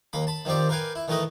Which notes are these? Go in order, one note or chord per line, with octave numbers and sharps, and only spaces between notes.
D#2 A#3 B5
A5 B5
D#3 F3 C4 G4 D5
A#4 B4 F5 G5 G#5
E4
D#3 E3 A3 A#4 B4 D#5